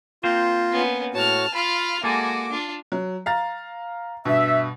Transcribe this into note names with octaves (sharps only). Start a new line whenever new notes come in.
A#3 C4 F4 C5
B3 C#4
A2 F#4 C#5 A5 F6
F4 B5 F6
G#3 A#3 F#4 A4 G#5 D6
D4 F4
F#3
F5 A#5 A6
G2 B2 E5